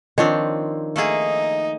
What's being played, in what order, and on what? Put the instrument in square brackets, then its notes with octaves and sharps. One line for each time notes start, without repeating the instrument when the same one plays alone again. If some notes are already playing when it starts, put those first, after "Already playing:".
[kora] D#3 F3 [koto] C4 D4 C#5
[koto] A3 A#3 G#4 [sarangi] D#4